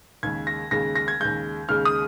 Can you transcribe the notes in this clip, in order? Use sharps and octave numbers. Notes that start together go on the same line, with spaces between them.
D#2 C#3 G#3 G#6
A#6
D#2 C#3 G#3 A#6
A#6
G#6
D#2 C#3 G#3 G6
D#2 C#3 G#3 F6
D#6